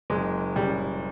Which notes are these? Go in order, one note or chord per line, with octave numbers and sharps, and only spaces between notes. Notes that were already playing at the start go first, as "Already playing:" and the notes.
F#1 G#3
C#3 G3